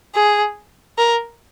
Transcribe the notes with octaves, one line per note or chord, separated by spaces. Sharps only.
G#4
A#4